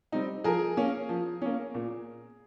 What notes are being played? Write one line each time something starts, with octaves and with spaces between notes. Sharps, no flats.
G3 C4 D#4
F3 G#4 A#4
A#3 C#4
F3
A#3 C#4
A#2